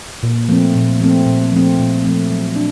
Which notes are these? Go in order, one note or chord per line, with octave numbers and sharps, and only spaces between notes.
A#2
F3 A3 C4
A#2
F3 A3 C4
A#2
F3 A3 C4
A#2
F3 A3 C4
F#3
D4